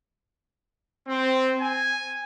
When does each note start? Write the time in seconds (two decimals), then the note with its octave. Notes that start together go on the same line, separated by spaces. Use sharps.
1.08 C4
1.61 G#5